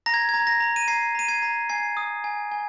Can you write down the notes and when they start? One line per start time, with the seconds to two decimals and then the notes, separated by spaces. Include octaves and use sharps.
0.06 A#5 A#6
0.14 G#6
0.29 A#5 G#6
0.47 A#6
0.60 A#5
0.76 D#7
0.88 A#5 G#6 C7
1.15 A#5 D#7
1.28 G#6 C7
1.42 A#5
1.69 G#5 G#6 C7
1.97 D#6
2.24 G#5
2.52 G#5